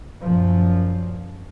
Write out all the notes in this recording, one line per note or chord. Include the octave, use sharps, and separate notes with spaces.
F#2 A#2 F3